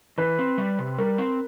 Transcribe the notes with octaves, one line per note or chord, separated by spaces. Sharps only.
E3 B4
C4
G3
C3
G3 A#4
C4